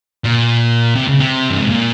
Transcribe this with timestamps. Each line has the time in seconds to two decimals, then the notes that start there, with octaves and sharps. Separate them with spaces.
0.24 A#2
0.95 C3
1.08 C#3
1.20 C3
1.50 G2
1.59 G#2
1.66 A#2